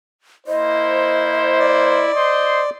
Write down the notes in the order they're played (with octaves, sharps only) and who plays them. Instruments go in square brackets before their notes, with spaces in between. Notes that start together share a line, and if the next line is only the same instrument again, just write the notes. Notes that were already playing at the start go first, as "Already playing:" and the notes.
[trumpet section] A#3 E4 C5 [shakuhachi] D#5
[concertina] D5
[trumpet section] C5 D#5 C6